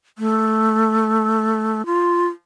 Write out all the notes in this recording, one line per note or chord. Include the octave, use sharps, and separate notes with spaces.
A3
F4